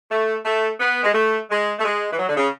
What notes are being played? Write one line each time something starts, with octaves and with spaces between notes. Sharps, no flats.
A3
A3
B3
G#3
A3
G#3
A3
G#3
E3
F#3
D3
C#3